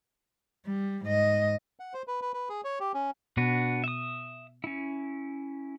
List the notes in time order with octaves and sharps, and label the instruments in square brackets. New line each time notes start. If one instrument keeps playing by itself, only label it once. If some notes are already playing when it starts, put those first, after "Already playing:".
[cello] G3
G#2 D#5
[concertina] F#5
C5
B4
B4
B4
G#4
C#5
G4
C#4
[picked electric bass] B2 [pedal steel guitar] D4 F#4 B4
[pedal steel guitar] E5 D#6
C#4 E4